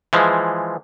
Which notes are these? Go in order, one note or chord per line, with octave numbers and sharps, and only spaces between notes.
E3 F3 G#3